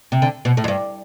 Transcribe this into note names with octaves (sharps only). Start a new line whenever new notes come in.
C3
D3
B2
A2
F2
G2